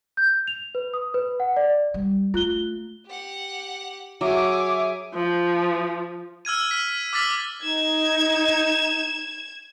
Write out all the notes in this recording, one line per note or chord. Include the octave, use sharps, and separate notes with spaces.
G6
F7
B4
D#6
B4
F#5
D5
G3
A3 F4 F#6 G7
G4 F#5
F#3 G#4 C#5 E5 D6
F3
E6 F6 G#6 D#7
F6 B6
D6 E6 F6 A6 B6 F#7
D#4 G#6 E7